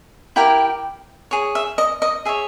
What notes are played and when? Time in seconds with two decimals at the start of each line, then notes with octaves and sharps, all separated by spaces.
0.36 E4 G4 A#4 G5
1.31 G#4 C#5
1.55 E5
1.78 D#5
2.02 D#5
2.25 G#4 C#5 E5